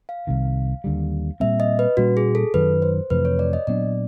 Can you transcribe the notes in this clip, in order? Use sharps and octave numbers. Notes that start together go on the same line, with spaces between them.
F5
C2 C3 D#3
D#2 D3 G3
A#2 G3 C4 E5
D#5
B4
A#2 G3 A#3 C#4 F#4
G#4
A4
F#2 D#3 F#3 B4
C5
F2 C3 E3 A3 B4
C#5
D5
D#5
A#2 F#3 B3 D4 D5